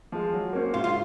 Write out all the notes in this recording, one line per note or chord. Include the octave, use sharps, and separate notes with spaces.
F3 G#3
F#3
A#3 C#4 F#4 C5
G#2 F4
F4